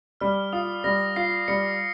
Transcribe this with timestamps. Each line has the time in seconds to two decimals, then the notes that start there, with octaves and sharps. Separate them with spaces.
0.21 G3 F6
0.53 F4 D#6
0.84 G3 A#6
1.16 F4 C7
1.48 G3 C#7